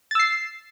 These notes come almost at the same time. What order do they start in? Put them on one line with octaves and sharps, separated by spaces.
A6 E6 C7